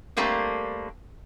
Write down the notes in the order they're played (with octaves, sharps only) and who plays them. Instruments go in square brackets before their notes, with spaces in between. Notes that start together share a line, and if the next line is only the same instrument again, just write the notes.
[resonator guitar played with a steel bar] G3 A3 A#3 C4 D4